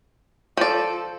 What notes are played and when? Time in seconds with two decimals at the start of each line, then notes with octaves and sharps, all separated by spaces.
0.57 F3 F4 A4 D5 G6